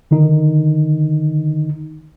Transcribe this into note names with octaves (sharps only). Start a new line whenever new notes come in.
D3 D#3 D#4